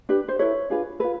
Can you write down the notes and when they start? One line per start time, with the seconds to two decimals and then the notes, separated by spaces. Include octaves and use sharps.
0.09 D4 G4 B4
0.28 C5
0.39 E4 A4 B4 C#5
0.70 D4 F4 G#4 B4
1.00 F4 A4 B4